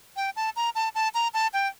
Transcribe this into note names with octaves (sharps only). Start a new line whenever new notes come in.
G5
A5
A#5
A5
A5
A#5
A5
G5